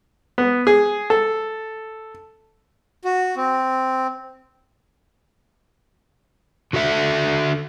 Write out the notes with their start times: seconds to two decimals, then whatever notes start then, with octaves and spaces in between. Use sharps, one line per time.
0.38 B3
0.67 G#4
1.10 A4
3.04 F#4
3.37 C4
6.73 D3 F#4 A4 E5